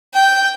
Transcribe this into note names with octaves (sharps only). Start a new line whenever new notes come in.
G5